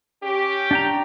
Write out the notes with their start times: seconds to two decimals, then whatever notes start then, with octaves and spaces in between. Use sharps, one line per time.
0.22 C#4 G4
0.71 D4 G5 A#5